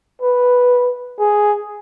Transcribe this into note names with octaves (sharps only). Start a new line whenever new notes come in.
B4
G#4